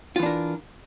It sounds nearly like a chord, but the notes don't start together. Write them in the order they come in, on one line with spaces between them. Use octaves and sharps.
F4 E3 D4 A#4